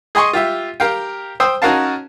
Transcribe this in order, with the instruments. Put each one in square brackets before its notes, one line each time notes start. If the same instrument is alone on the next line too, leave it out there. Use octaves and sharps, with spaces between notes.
[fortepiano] G#4 D#5 G#5 C6 C#6
F4 G4 E5
G4 A#4 F5 G5
C5 G5 D#6 E6
C#4 D#4 F#4 A#4 F5 A5